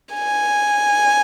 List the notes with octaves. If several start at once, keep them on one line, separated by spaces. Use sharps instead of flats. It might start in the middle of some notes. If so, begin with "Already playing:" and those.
G#5